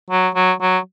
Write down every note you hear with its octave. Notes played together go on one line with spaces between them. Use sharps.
F#3
F#3
F#3